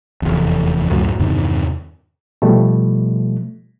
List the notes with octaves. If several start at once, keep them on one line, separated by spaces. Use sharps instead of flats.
F1 E2
C#2 F#2 A2 F#3
E2 G2 C3 D#3
B2 F3 G3 A3